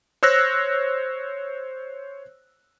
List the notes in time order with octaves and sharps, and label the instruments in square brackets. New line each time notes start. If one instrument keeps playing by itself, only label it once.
[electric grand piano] C5 C#5 E6 F#6 A#6